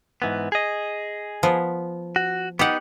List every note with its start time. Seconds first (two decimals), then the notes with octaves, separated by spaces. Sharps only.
0.22 G#2 E3 B3
0.52 G#4 D#5
1.43 F3 B3
2.16 F#4
2.59 B3 D#4 G4 F#5